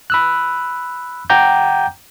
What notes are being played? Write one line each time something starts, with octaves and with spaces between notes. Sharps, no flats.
B5 E6 F#6
F#5 G5 A#5 D6 G6